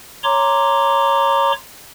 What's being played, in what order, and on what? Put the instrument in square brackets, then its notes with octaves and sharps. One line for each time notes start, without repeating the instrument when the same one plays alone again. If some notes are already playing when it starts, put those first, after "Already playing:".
[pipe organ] C#5 A#5 C6 D6